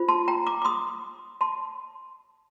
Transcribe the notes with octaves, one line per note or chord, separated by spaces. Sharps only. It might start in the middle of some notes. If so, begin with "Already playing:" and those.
Already playing: F4 C5
A5 C6
G5 A#5
A#5 D6
D6
C6 D#6
A5 C6